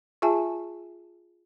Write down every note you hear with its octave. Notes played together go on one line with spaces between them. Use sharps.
F4 G#4 E5 G#5 A5